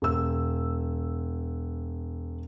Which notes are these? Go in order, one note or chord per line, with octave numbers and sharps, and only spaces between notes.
E1 E6